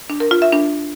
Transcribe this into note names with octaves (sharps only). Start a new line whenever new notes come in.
D4
A#4
F4
E5
D4